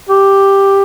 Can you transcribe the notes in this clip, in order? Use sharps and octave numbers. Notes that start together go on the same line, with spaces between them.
G4